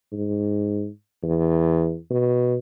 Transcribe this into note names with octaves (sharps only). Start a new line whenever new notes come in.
G#2
E2
B2